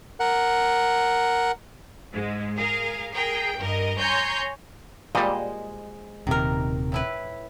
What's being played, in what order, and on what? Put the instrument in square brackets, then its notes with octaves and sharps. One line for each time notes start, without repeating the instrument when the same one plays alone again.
[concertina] A#4 F#5
[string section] G#2 G#3
G#4 A#4 F5
G#4 A#4 G5
G2 A#4 D#5
C#5 G#5 A#5 C6 G6
[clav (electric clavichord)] A#2 G3 [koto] G#3 C5 D#5
[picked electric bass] D#1 C3 [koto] D#3 A#4
[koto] A2 E4 B4